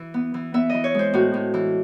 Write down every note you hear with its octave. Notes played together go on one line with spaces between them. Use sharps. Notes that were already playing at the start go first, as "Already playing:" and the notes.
Already playing: E3
B3
E3
B3 E5
E3 D#5
C#5
G#3 C5
A2 F#4
A2
E3